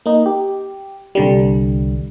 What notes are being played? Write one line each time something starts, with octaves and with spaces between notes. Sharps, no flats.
A#3 D#4
G4
C2 D3 G3